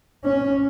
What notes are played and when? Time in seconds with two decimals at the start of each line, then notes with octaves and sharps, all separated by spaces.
0.25 C#4